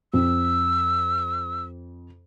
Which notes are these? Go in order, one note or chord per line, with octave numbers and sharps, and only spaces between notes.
F2 E6